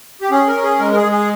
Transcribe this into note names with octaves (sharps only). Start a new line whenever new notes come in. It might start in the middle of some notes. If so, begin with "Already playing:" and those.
G4
C#4 G#4
A#4
C#4
G#4
G#3 A#4
A#4
G#4
G#3
G#4